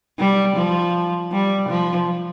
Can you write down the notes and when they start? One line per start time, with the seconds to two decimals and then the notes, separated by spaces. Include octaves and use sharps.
0.19 G3
0.56 F3
1.32 G3
1.69 F3